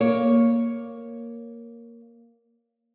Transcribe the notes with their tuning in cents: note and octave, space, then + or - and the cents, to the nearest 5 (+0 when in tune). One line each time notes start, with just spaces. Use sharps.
A#3 +0 C#5 +0